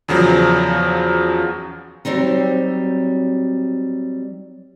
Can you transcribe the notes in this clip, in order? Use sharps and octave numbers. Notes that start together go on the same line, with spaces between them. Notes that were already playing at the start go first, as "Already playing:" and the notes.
E2 C#3 F3 F#3
F#3 G3 C4 D#4